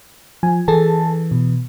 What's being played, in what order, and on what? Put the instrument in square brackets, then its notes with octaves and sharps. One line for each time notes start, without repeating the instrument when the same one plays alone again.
[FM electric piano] F3 G#5
[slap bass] E3 [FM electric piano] G#4 A4 A5
[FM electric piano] B2